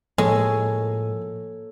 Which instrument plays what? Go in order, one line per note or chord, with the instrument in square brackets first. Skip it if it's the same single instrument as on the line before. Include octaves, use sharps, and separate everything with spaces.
[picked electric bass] A2 F3 [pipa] G#3 [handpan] A#3 A4 C#5